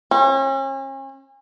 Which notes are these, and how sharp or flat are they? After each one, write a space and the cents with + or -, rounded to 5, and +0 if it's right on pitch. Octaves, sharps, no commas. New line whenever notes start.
C#4 -40